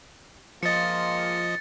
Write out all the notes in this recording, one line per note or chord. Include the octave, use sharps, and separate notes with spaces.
F3 G#3 A#3 F4 D#5 A6 C#7